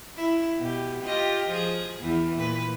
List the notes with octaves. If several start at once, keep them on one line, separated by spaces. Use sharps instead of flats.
E4
B2 G4
F4 G4 D#5
F3 G#4
E2 E3
A#2 B4